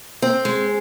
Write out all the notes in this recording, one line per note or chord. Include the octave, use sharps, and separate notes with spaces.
C4
G#3